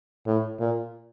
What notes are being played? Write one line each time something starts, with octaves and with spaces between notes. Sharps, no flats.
A2
A#2